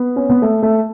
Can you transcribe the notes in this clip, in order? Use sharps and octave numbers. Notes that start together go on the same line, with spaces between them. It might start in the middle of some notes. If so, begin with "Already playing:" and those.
Already playing: B3
C#4
B3
A3
A3